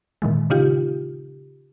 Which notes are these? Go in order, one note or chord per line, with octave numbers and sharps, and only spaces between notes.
A#2 D#3 E3 G#3
C#3 D#4 F4 G4